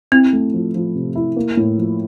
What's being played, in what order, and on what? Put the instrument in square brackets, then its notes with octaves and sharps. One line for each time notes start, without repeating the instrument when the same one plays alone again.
[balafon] C4 [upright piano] E4
[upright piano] A3
F3
F3
C3
E4
A#3
A2
F3